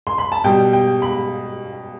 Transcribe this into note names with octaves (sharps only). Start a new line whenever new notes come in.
C6
B5
A5
B2 G3 G5
G5
B5